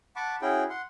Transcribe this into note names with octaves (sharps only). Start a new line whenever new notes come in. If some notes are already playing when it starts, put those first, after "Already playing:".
F#5 A5 B5 C#6 D6
C#4 E4 F#4 G#4 G5
F#5 C6